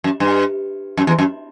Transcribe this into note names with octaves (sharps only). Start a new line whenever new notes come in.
F#2
G2
F#2
E2
F#2